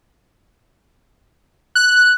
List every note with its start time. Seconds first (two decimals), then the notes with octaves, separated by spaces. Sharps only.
1.75 F#6